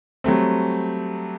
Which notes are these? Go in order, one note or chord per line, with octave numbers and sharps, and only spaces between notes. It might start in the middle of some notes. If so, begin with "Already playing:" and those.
F#3 G3 A3 C4